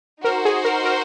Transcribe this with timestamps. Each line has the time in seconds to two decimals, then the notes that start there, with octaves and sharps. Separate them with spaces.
0.24 D#4 F#4 A#4 C5
0.45 G#4
0.65 A#4
0.85 A#4